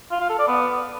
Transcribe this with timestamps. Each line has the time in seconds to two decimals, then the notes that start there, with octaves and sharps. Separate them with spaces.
0.11 F4
0.20 F5
0.30 A4
0.39 D5
0.48 B3